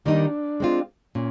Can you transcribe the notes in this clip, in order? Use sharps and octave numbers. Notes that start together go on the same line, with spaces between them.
D#3 G3 A#3 D4 D#4
G#3 C4 F4
A#2 C#4